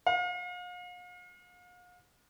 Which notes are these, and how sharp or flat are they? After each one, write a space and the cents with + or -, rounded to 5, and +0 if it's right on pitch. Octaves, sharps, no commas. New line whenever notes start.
F5 +40